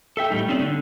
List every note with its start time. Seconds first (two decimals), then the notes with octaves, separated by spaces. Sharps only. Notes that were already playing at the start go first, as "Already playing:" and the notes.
0.17 A4 E5 G5
0.30 A2 G3 D#4
0.48 A3 C4 C#4 D#4 A#4 D5
0.60 D3